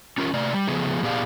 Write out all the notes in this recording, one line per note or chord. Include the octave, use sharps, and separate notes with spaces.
C#4 F4 A#4
C3 A3 D5
G3
C#3 F3 A3 B3 G#4
A#2 B3 G4 G#4 D5 F5